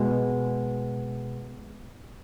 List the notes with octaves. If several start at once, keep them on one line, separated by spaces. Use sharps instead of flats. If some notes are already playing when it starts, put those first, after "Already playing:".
Already playing: B2 G#3